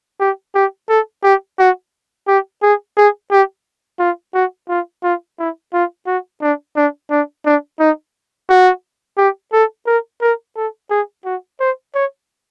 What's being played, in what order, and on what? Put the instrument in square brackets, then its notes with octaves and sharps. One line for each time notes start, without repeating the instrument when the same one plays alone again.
[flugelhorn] G4
G4
A4
G4
F#4
G4
G#4
G#4
G4
F4
F#4
F4
F4
E4
F4
F#4
D4
D4
D4
D4
D#4
F#4
G4
A4
A#4
A#4
A4
G#4
F#4
C5
C#5